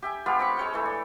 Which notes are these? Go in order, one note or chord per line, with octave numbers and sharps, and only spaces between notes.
G4 E5 G#5
G#3 B3 F4 G4
C4 B5 C#6
G#3 C#5 G5
E3 A3
D5